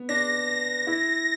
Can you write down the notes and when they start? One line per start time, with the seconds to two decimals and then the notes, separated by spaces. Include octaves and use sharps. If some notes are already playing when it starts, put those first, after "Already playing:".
Already playing: B3
0.09 D4 A#6
0.87 E4